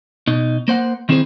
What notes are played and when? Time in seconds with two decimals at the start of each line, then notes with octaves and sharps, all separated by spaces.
0.27 B2 D#4
0.68 A#3 C5 F#5
1.09 D#3 C4 E4 G#4 C5